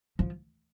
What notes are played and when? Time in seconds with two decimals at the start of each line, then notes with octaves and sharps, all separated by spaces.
0.19 F3